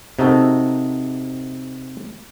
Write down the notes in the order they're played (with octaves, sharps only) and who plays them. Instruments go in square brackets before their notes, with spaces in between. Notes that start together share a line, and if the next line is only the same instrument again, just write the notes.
[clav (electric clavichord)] C3 D#4 F#4 A4 A#4